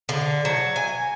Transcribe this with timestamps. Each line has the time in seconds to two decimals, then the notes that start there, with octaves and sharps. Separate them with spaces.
0.09 D3
0.45 F#3
0.76 G#5